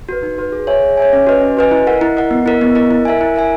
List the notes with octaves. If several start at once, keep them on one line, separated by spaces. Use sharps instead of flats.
F#4 B4
D#4
F#4 B4
G#4
C#5 E5 G#5
G#4
C#5 E5 G#5
C#4
F#4 B4 D#5 G#5
C#4
F#4 B4 D#5 G#5
E4
A#4 D#5 F#5
E4
A#4 D#5 F#5
B3
E4 A#4 D#5
B3
E4 A#4 D#5
E4
A#4 E5 G#5
E4
A#4 E5 G#5